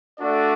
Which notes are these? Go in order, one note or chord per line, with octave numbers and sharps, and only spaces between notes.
A3 D4 F#4 A4 D5